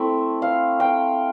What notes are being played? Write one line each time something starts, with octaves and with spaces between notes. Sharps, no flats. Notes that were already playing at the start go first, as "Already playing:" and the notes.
Already playing: A3 C4 E4
F5
G5